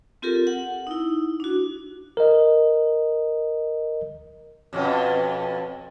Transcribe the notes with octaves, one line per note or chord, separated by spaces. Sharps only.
C4 F4 G4 A4 A#4
F#5
D#4 E4
D4 F#4
A#4 D#5
F2 B2 C#4